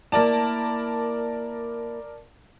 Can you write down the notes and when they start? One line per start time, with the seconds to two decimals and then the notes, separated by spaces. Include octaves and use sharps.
0.12 A#3 E4 A#4 D5 A5